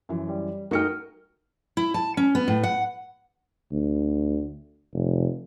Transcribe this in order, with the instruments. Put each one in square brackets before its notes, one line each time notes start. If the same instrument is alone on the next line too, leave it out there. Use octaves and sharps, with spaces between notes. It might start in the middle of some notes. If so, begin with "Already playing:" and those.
[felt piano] F#2 E3
[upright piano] G3
[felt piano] A3 C#7 [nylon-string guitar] D#4 G5 [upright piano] F#4 [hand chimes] A#4 F6
[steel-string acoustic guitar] E4
A5
C#4
B3
A2
F#5
[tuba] D2
F1